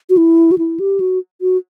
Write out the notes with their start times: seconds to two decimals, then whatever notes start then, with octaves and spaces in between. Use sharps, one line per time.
0.10 F#4
0.17 E4
0.51 F#4
0.58 E4
0.80 G4
1.00 F#4
1.41 F#4